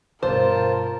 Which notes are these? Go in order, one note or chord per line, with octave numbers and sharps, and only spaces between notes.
G2 B2 F4 A#4 C5 A5